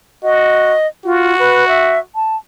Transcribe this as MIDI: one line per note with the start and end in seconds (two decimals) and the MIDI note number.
0.24 0.75 66
0.24 0.87 75
1.05 1.35 65
1.05 2.02 66
1.39 1.67 71
1.68 1.99 76
2.15 2.36 81